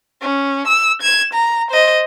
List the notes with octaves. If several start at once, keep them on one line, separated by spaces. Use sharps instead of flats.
C#4
E6
G#6 E7
A#5
C5 D#5